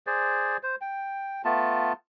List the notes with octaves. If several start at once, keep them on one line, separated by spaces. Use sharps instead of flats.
G#4 C5 D5
C5
G5
A3 B3 F4 A5